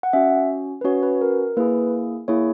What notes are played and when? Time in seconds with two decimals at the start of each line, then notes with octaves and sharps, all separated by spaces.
0.03 F#5
0.13 C#4 F#4 E5
0.81 B4
0.84 C#4 F#4 C#5
1.03 B4
1.21 A#4
1.57 A#3 E4 G#4 B4
2.28 A#3 E4 G#4 C#5